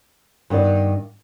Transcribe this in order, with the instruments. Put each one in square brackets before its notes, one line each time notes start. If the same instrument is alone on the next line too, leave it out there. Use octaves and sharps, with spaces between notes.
[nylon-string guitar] G2 D#3 B3 D5